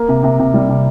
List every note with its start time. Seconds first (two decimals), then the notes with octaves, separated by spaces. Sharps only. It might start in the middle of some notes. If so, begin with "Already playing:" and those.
Already playing: A#3
0.09 C3
0.24 C3
0.39 C3
0.54 G3
0.69 C3